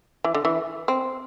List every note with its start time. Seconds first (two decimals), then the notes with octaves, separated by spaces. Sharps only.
0.24 E3
0.34 D3
0.45 E3
0.88 C4